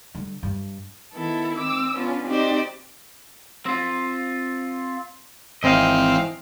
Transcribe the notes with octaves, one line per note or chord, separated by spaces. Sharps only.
D3 G3
G2
D#3 B3 E4 A4
C4 D6 E6
B3 C#4 D4 F4
C4 D#4 F#4 G4 C5 D5
C4 F4
G#1 E3 C4 D#5 F5